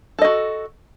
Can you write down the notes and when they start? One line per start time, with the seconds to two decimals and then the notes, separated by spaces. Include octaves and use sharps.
0.19 A4
0.22 D#5
0.25 F#4